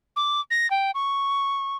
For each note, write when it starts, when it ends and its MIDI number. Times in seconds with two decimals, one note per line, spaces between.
0.16 0.41 86
0.50 0.69 94
0.70 0.91 79
0.95 1.77 85